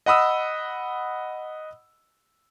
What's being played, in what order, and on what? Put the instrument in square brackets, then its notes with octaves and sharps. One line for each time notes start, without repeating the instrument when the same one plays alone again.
[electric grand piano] D#5 F#5 B5 D#6 E6